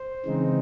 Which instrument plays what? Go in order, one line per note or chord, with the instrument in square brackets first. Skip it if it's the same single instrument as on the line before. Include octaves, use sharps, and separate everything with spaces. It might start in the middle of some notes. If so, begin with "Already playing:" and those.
Already playing: [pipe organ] C5
C#3 E3 G#3 C4 D#4